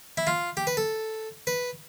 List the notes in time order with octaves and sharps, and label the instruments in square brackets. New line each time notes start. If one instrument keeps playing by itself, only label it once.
[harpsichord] E4
F4
G4
B4
A4
B4